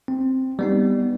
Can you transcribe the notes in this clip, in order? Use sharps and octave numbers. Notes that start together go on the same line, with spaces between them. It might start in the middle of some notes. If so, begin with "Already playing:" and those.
C4
G3 B3 D#4